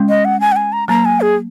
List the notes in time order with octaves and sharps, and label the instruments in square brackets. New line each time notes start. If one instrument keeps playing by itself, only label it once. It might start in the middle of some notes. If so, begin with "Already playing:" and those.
Already playing: [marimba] G#3 C#4
[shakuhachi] D#5
F#5
G#5
F#5
G#5
A#5
[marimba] F#3 A#3 [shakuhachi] A#5
[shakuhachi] G#5
G#4